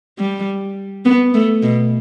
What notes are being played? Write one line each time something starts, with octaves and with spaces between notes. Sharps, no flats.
G3
B3
A3
B2